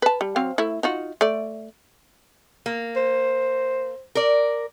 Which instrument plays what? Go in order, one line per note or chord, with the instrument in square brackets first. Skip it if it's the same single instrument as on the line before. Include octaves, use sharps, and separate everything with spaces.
[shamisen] B4 A5
G3
F#3 C4 F5
A3 E4
D#4 F4 F#4
A3 D5
[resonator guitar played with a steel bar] A#3
[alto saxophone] C5
[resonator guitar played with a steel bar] A#4 D5